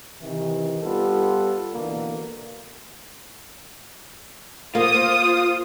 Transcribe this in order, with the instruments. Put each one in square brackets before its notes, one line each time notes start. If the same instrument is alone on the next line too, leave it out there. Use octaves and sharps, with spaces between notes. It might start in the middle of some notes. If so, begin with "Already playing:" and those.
[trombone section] C3 D#3 E3
G3 B3 F4 A4
B2 D3 E3 A#3
[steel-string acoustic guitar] A#3 [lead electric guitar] F4 [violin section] C5 D#6